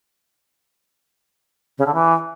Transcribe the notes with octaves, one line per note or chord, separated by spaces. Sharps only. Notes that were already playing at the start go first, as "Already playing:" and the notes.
C#3
D3
E3